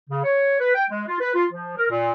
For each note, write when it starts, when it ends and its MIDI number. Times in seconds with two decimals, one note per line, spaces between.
0.10 0.23 49
0.24 0.57 73
0.60 0.74 71
0.75 0.84 79
0.90 1.03 56
1.07 1.19 65
1.20 1.32 71
1.35 1.46 65
1.51 1.73 53
1.77 1.88 70
1.90 2.12 46